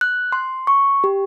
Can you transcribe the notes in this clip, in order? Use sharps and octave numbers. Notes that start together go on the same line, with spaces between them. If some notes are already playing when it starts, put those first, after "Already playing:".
F#6
C6
C#6
G4